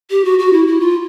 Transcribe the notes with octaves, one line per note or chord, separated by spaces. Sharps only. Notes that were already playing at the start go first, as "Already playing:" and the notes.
G4
F#4
F#4
E4
E4
F4